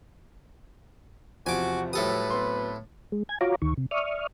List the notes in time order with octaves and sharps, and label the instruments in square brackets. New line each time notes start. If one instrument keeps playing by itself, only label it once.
[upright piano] E2 C3 [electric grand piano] F3 [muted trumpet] F#4 [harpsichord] G#5 D6
[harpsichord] A2 A4 D#6 [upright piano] F#3 G3 G4 [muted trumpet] B4
[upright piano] F#3 B3 C4 [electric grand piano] C6
[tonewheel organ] G#3
G#5 G#6
F4 F#4 C#5 F5 A#5 D6
D2 D#3 C#6
C3
D5 E5 C#6 D#6 F6